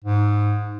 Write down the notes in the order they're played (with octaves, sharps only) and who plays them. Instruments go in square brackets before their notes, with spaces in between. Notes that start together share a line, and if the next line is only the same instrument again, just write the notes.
[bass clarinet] G#2